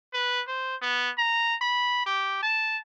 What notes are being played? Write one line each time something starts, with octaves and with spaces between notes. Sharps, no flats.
B4
C5
B3
A#5
B5
G4
A5